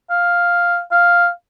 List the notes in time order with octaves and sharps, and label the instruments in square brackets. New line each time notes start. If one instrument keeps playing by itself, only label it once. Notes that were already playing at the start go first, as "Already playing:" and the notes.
[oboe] F5
F5